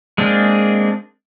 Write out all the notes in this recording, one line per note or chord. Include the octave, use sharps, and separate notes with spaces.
G#3 A#3 C4 D4 G#4